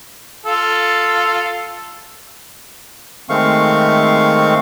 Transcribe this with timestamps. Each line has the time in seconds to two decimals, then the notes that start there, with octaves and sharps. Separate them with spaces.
0.46 F4 A4
3.29 D#3 G#3 A3 C4 F5 C#6